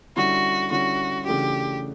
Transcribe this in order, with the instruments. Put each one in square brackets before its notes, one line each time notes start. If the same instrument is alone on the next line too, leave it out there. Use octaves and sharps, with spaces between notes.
[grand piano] D3 G3 C#4 E4 [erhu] F#4
[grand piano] D3 G3 C#4 E4 [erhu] F#4
[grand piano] C#3 E3 A3 D4 F#4 [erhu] G4